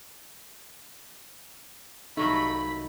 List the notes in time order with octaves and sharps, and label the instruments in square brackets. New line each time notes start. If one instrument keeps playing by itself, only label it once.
[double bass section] C2 [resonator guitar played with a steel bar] F3 F#3 A3 [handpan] D#4 [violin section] B5